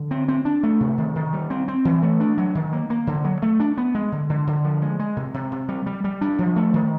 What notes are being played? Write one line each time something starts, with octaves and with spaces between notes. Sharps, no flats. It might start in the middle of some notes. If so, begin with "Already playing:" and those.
Already playing: D3
C4
C4
D4
A3
C3
D#3
D#3
G3
C4
C4
E3
A3
D4
F#3
D#3
A#3
A#3
D3
F#3
A3
D4
B3
G#3
D3
D3
D3
F3
G#3
G#3
C3
C3
C3
G3
G3
G3
D4
F3
A3
D#3